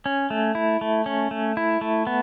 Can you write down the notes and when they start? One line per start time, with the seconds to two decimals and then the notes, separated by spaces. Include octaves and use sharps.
0.06 C#4
0.30 A3
0.55 E4
0.81 A3
1.06 C#4
1.31 A3
1.57 E4
1.81 A3
2.07 B3